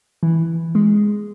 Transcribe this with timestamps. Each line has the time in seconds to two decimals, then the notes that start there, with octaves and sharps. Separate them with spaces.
0.23 E3
0.75 G#3